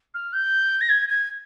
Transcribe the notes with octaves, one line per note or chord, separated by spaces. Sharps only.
F6
G6
A#6
G#6
G#6